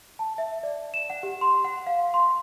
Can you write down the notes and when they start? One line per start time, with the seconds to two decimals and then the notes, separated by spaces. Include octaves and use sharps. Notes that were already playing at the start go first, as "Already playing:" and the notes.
0.19 A5
0.38 E5
0.63 D5
0.94 E7
1.10 F#5
1.23 G4
1.41 C6
1.64 F#5
1.87 F5
2.14 C6